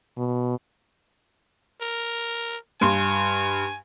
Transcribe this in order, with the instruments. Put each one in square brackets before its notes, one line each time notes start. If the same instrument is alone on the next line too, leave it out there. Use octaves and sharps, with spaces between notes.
[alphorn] B2
[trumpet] A#4
[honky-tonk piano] G2 C6 [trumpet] G#5